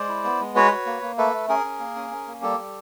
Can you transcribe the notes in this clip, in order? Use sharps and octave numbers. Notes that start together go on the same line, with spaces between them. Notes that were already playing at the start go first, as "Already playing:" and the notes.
Already playing: G#3 C5 D5
E4
B3
G#3
F#4 B4 C#5
F#4
A#3
A#3
A3 A4 B4
A3
C#4 G#4 A#4
C#4
A#3
C#4
C#4
A#3
G3 G4 A4
G3